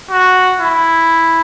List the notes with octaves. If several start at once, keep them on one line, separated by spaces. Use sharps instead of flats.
F#4
E4